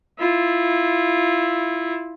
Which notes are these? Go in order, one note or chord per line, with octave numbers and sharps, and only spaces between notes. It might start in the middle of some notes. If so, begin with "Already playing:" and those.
E4 F4